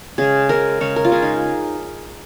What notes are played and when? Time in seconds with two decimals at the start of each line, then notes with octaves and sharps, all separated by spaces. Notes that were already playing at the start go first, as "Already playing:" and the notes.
0.18 C#3 G#3 G#4
0.49 C#3 G#3 A#4
0.81 C#3 G#3 C#5
0.96 A#4
1.05 F4
1.12 C#3 G#3 G#4
1.22 D#4